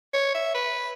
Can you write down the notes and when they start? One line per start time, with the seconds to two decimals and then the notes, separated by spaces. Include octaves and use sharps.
0.14 C#5
0.34 E5
0.54 B4